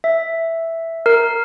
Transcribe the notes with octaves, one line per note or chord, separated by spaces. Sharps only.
E5
A#4